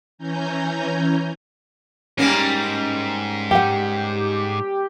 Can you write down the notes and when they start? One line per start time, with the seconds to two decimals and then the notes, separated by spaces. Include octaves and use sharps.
0.18 E3 C#4 G#5 A#5 G6
2.18 G#2 G3 A#3 C#4
3.51 G4 F#5 G5